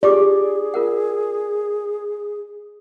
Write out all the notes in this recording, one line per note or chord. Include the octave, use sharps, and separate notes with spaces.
F4 G4 G#4 D5 D6
F4 A#4 F#5